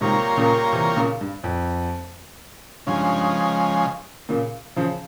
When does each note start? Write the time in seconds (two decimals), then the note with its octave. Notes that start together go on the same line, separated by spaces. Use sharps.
0.01 G#2 C3 G3 A#3 F4 A#4 C#5
0.37 A#2 C#3
0.73 C3 E3
0.96 A#2 C#3
1.21 G2
1.44 F2
2.87 G2 C#3 F3 G#3
4.29 A#2 C#3
4.76 C#3 F3